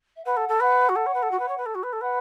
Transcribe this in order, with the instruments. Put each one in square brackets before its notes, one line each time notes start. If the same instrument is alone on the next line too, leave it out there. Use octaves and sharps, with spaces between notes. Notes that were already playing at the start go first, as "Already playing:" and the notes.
[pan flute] E5
[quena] B4 [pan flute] F#5
[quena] A4
A4
[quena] B4 [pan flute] F#5
[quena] F#4
A4
C#5
B4
A4
F#4
B4
C#5
B4
A4
F#4
B4
A4
[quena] B4 [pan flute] F#5